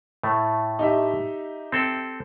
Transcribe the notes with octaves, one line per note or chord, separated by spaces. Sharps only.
A2 A3
D#4 G4 E5
C4 A4 G5